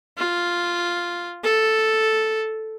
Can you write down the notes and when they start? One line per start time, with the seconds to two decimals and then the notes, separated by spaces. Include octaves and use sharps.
0.18 F4
1.44 A4